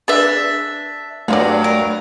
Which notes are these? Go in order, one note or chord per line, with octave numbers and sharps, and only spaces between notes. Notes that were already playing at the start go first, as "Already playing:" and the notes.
D4 G#4 B4 D5 E5
G2 F#3 A3 F4 C#5 D5
A#4